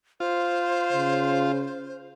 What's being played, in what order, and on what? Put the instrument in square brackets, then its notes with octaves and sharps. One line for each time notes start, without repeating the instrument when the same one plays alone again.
[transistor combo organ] F4 [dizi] C5
[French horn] C#3